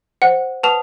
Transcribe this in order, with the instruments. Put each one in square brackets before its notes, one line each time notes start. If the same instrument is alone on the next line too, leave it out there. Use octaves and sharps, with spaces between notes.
[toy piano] C5 [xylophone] F#5
[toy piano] B4 F#5 D#6 [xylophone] A5 F7